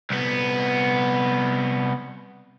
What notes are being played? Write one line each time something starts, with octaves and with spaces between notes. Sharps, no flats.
C2 B3